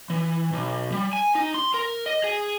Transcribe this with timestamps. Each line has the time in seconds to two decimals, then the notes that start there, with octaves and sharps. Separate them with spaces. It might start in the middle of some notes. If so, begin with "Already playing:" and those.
0.10 E3
0.52 B1
0.92 G3
1.13 G#5
1.35 D#4
1.54 C6
1.74 A#4
2.06 D#5
2.24 G#4